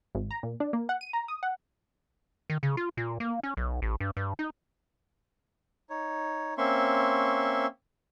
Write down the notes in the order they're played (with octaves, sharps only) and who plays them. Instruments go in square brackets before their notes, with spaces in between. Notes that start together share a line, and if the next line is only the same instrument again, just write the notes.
[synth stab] G#1
A#5
A#2
D4
A#3
F#5
D#7
A#5
D#6
F#5
[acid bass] D#3
C#3
F4
A#2
A#3
C#4
B1
A1
G2
G2
D#4
[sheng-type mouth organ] D#4 C#5
A#3 C4 C#4 E5 C6 C#6